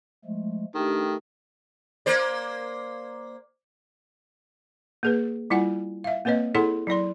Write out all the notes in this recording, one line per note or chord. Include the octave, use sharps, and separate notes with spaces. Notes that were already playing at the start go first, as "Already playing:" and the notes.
F3 G#3 A3
D#3 A3 D4 G4
A#3 C5 D5
A#3 G#4 B4
G3 E4 F4 F#5 G#5
E5 F5
A#3 C4 B4 C#5 D#5
E4 G#4 A4 C#5 F#5 C6
F#3 E4 D5 C6